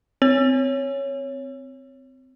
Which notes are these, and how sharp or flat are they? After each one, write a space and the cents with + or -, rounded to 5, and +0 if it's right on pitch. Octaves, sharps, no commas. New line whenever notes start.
C4 -15 C#5 +0